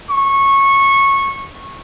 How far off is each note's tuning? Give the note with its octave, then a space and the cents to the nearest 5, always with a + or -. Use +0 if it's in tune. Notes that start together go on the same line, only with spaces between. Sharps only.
C#6 -15